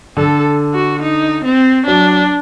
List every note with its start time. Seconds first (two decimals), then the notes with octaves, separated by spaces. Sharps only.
0.17 D3 A4
0.74 F#4
1.02 D#4
1.45 C4
1.87 F#3 D4